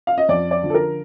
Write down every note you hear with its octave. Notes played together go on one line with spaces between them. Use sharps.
F5
D#5
F2 D5
D5
D3 F3
A4
A#4